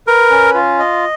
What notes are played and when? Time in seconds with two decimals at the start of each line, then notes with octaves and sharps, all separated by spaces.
0.07 A#4 B4
0.30 C#4
0.54 F4
0.79 D#5